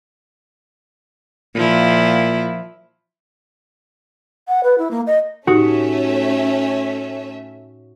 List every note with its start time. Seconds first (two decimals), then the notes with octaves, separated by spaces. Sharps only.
1.55 A#2 F3 E4
4.48 F#5
4.63 B4
4.78 E4
4.91 A#3
5.07 D#5
5.47 A2 A3 C#4 D#4 F#4 G4 E5